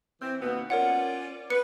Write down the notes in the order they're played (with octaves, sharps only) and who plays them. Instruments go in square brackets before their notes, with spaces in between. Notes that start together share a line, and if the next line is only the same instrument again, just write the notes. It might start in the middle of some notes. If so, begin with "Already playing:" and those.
[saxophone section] E3 C4
D#2 B2 B3
[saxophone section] C#4 F4 D5 [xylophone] A#4 C#5 F#5
[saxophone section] B4 [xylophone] C#7